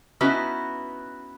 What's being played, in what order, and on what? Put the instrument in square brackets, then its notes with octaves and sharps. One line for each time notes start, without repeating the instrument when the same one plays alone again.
[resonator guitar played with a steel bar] B3 C#4 D#4 E4 F#4 B4